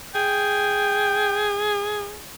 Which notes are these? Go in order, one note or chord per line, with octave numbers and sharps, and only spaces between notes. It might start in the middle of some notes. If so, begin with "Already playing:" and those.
G#4 G5